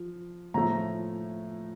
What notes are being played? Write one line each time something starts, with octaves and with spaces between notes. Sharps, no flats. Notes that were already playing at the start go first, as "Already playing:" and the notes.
Already playing: F3
A2 F3 A3 A#5